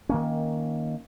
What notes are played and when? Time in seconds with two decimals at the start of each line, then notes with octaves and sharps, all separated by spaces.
0.09 D#3 A#3 C#4